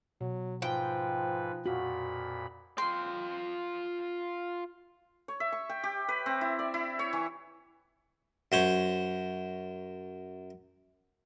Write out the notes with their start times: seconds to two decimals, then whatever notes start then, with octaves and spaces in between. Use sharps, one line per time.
0.21 B2 F#3
0.62 G#2 F3 B4 G5
1.66 F2 A#2 F#4 B5
2.78 F4 G5 C6
5.28 C#5
5.40 E5
5.52 C#6
5.70 G5
5.84 G4
6.09 B4
6.26 C4
6.41 E4
6.59 D5
6.74 E4
6.99 C#5
7.13 E3
8.52 F#2 C5 C#5